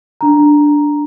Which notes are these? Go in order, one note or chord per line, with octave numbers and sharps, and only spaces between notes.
D4 A#5